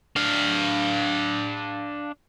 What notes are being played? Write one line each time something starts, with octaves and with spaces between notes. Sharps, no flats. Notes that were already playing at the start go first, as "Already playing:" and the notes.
D4 F5